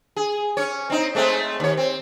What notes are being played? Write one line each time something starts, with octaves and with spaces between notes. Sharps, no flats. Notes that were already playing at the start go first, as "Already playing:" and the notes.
G#4
C#4 C#5
C4 D#4
G#3 A3 C4
D#2 C#5
C4